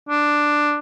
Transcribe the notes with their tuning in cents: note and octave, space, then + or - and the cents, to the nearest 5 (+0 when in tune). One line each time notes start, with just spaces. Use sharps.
D4 +5